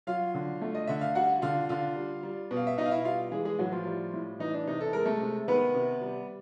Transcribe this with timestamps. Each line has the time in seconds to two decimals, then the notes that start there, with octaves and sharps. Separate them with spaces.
0.07 F#3 F4 F5
0.34 D3
0.62 A3
0.75 D#5
0.87 D3 E5
1.01 F5
1.15 G3 F#4 F#5
1.42 D3 F4 F5
1.69 D3 F4 F5
1.96 G3
2.23 G3
2.51 B2
2.57 F5
2.67 E5
2.77 B2 D#4 D#5
2.86 F5
2.91 E4 E5
3.05 G3 F4 F5
3.32 E3 G#3 G#4
3.45 G#3 G#4
3.59 A2 F#3 F#4
3.72 F3 F4
3.86 G3
4.14 A2
4.39 E3 D#4
4.54 D4
4.67 C3 D#4
4.81 A4
4.93 G#3 A#4
5.06 A3 A4
5.21 C3
5.48 D#3 B3 B4
5.75 C3
6.02 G3